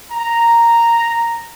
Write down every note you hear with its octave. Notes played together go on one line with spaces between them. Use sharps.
A#5